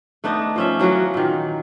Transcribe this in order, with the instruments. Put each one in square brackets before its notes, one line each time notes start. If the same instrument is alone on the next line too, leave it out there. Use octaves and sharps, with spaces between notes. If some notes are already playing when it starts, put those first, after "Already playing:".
[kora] A3 B3 D4 D#4
F3 C#4 E5
E3 F#3 A#3 F#4
A#2 D#3